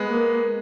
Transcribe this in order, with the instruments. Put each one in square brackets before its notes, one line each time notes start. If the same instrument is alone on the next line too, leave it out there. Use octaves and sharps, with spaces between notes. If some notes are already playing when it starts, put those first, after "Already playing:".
Already playing: [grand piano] G#3 B3
[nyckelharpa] A#3